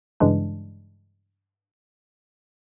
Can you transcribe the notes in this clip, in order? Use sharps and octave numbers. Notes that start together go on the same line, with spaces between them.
G2 C#3 E3 G#3 D4